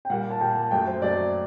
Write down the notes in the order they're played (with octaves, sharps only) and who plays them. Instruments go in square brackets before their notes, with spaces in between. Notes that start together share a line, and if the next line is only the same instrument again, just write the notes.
[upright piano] G5
[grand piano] A#2 G3 A#3 [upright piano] F#5
[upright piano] A5
[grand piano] A#2 G3 A#3 [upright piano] G5
[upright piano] A5
[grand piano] F#2 F#3 A3 [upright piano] G5
[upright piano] C5
[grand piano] F#2 F#3 A3 [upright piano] D5